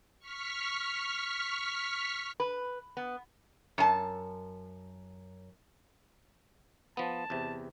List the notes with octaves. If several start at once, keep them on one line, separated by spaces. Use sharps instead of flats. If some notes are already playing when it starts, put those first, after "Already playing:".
C#6 F6 B6
B4
B3
F#2 A5
F3 B3 A5
E2 C3